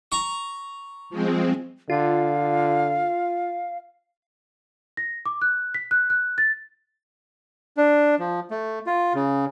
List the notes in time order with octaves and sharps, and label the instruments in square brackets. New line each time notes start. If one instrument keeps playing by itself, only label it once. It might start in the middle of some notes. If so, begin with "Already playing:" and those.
[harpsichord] A#5 C#6
[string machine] F3 G#3 C4
[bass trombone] D3 [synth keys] F4 [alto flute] F5
[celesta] A#6
D6
F#6
B6
F#6
F#6
A6
[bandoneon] D4
F3
A3
F4
C#3